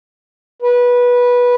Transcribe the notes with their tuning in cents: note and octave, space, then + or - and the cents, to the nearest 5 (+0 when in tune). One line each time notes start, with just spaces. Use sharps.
B4 -15